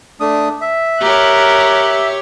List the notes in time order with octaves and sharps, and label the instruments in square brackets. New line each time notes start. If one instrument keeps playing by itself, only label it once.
[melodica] A3 D4 D#6
E5
[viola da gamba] G4 C#5 [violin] A#4 F#6